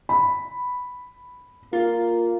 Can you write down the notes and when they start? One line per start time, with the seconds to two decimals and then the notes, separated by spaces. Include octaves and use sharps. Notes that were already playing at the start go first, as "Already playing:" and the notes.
0.09 B5
1.73 A#3 F4